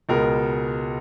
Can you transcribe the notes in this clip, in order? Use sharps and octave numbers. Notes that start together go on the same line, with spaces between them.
C#2 B2 G#3 A#4